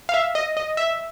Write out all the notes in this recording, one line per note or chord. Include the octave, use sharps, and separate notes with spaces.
F5
E5
D#5
D#5
E5